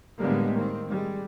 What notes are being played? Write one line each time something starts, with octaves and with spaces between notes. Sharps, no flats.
A2 D3 G3 G#3 A#3 B3
D#3 A#3 C4
G3 G#3